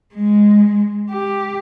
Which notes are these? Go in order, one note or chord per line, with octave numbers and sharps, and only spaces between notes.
G#3
G4